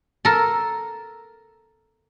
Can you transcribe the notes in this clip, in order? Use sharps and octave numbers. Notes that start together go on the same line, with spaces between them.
A4 A#4